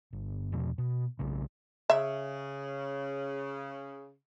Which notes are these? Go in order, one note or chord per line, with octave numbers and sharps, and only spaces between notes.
G1
E2 B2 F3
B2
B1 C#3
C#3 E5